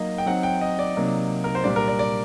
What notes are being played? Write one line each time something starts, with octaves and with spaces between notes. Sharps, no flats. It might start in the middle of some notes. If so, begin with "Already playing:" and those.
Already playing: F#3 A#3 D#4 D#5
G5
F#3 C4 D#4 F#5
G5
D#5
D5
C3 F#3 A#3 D#4
A#4
C5
A#2 G3 D4 D5
A#4
D5
D5